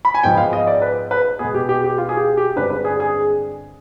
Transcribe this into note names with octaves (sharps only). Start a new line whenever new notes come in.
B5
G#5
G#2 F3 G#3 B3 G5
F5
D#5
D5
B4
B4
B2 G#3 B3 G#4
G4
G4
G4
F4
G#4
G4
G4
G2 D3 G#3 C4 B4
B4
G#4
G#4